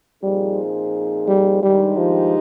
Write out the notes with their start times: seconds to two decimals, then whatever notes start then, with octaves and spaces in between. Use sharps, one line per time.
0.23 A#2 F3 G3 C4 D#4 G#4
1.28 G3
1.63 G2 D#3 G3 G#3 D#4 G4
1.98 F3